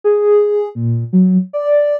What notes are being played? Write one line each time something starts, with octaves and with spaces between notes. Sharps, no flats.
G#4
A#2
F#3
D5